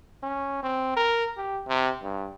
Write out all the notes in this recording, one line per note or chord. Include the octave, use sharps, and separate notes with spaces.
C#4
C4
A#4
G4
C3
G2